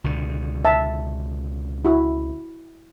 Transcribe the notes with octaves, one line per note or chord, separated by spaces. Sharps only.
C#2 B2 D3
E5 A5
E4 F#4